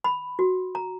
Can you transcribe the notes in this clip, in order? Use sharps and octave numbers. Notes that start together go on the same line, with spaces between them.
B5
F#4
A#5